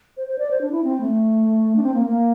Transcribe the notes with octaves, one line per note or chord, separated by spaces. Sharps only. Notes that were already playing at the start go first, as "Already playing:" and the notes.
C5
C5
D5
C5
D4
E4
C4
A3
D4
C4
A#3
A#3